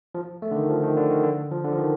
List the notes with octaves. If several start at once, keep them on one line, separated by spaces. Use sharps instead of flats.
F3
A3
D3
D#3
F3
D#3
D3
D#3
D3
F3
D3
F3
D#3